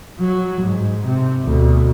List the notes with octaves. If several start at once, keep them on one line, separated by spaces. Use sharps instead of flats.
F#3
G#2
C3
D2 B2